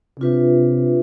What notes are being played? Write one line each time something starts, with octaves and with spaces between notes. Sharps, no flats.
C3 D4 F4 B4 E5